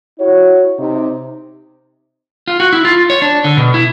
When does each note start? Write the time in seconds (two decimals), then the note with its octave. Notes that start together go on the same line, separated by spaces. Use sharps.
0.19 E4 F#4 C#5
0.79 C3 D#4
2.48 F4
2.60 F#4
2.73 E4
2.85 F4
3.10 C#5
3.22 D4
3.44 D3
3.57 B2
3.74 E4